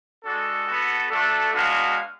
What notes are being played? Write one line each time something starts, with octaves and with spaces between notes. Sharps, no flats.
G#3 D4 F#4 A4
B3 F#4
A3 D4 F#4 A4
G#3 B3 D4 F#4 F5